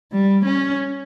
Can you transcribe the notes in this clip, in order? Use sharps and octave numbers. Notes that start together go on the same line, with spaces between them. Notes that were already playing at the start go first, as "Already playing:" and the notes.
G3
C#4